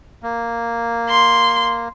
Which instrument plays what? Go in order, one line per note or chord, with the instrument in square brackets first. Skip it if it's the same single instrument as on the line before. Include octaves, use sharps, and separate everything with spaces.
[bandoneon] A#3
[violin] C6